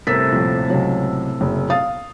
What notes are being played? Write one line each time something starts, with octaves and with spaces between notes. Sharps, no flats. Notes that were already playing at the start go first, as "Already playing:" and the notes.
G1 A2 C3 A4 A#4 B6
D#1 F3
C#2 F#3
F#1
F5 D#6 A6